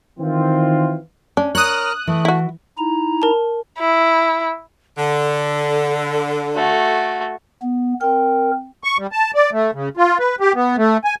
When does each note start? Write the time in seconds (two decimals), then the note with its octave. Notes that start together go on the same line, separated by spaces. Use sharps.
0.19 D#3 E3 C4 F4
1.37 C#4 D4
1.55 A#4 C#5 D#6 F6 F#6
2.07 E3 A3
2.25 E4 F#4
2.78 D#4 E4 A#5
3.22 A#4 A5
3.79 E4
4.98 D3 A4
6.55 A3 F#4
7.62 B3
8.01 C4 A#4 G5
8.84 C#6
8.99 G3
9.12 A5
9.35 D5
9.52 A3
9.74 C#3
9.97 F4
10.19 B4
10.40 G4
10.55 B3
10.78 A3
11.04 G#5